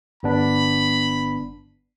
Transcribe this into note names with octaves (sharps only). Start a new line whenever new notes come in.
G1 B3 D4 B5